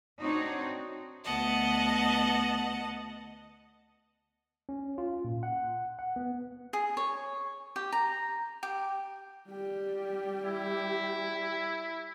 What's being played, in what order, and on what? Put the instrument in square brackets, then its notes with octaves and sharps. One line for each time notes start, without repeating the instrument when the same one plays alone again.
[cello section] C4 D4 D#4 F#4 C#5
[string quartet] D2 B3 D#5 F#5 A5
[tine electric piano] C#4
F4
A#2
F#5
F#5
B3
[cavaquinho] G#4
C#5
G4
A#5
G4
[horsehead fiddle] G3 G4
[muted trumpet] E4